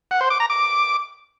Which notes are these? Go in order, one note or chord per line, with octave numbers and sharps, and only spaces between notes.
F#5
C5
D6
A#5
D6